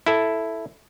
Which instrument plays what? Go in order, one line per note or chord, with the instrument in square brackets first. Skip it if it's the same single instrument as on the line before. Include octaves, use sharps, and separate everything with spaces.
[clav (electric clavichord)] E4 A4